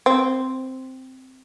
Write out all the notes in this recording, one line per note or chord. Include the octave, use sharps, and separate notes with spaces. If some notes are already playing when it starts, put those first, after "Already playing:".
C4